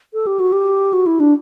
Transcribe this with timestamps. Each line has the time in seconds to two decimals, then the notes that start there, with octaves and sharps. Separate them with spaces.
0.14 A4
0.27 G4
0.39 F#4
0.52 G4
0.93 F#4
1.06 E4
1.20 D4